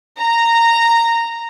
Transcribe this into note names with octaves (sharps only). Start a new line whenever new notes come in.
A#5